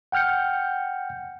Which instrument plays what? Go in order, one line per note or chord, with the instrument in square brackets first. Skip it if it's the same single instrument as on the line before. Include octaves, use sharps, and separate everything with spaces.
[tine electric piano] F#5 G5 F6 G6 C#7